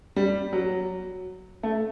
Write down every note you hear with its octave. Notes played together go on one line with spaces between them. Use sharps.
G3
F#3
A3